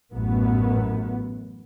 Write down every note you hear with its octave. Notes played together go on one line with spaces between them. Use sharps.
A1 F#2 A2 B3